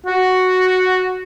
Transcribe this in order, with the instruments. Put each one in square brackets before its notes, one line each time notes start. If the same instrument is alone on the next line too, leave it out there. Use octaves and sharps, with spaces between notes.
[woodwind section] F#4